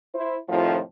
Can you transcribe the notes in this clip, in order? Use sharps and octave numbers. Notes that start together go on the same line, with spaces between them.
E4 C5
F2 A2 C3 D#3 F3